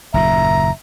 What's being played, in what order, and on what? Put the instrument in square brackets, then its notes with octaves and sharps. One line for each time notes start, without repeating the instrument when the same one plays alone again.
[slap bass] F#1 D#2 A#2 [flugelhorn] E5 [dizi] A#5